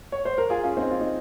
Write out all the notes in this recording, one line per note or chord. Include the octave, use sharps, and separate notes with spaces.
C#5
C5
A#4
F4 G#4
C#4 F4
C4 D#4
F4
D#4